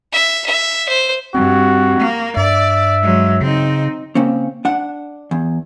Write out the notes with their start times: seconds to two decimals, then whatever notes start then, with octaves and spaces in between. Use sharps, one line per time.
0.12 E5
0.46 E5
0.89 C5
1.35 G2 C4 F#4
1.99 A#3
2.37 G2 D5 E5
3.01 F#3 G#3
3.41 C#3 C4 D#4
4.15 C#3 A#3 C4 C#4
4.65 D4 F#5
5.31 E2